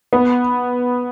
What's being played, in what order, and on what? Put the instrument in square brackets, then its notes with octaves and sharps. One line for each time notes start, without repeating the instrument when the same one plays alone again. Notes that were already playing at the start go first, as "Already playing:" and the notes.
[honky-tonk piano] B3